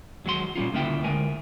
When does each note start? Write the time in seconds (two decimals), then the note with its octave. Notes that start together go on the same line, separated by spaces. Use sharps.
0.25 D#2 F#3 G#3 F#4 C6
0.56 A#2 G3 C#4 F4
0.73 D2 C#3 A#3 E4 G5
1.04 D2 G#3 A#4 G#5